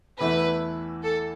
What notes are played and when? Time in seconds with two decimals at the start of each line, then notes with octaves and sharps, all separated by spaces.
0.20 E2 E3 A3 E4 B4
1.03 A4